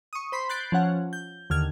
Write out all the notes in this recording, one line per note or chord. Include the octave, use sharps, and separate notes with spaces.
C#6 D#6
C5 B5 C6
B5 F#6 G6 A6 C7 D7
F3 C#4 F#5
G6
D#2 D3 F6 G#6